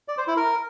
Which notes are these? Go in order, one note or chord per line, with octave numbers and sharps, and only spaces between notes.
D5
C5
E4
A#4